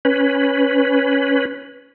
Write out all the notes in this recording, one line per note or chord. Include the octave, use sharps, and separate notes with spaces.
C#4 B4